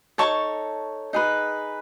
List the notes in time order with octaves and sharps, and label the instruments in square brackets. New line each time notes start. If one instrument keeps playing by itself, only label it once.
[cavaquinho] D#4 A4 C#5 A5 C#6
D#4 G#4 B4